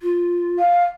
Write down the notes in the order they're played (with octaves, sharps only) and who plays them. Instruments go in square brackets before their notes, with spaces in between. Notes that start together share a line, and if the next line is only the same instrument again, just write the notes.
[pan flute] F4
[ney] F5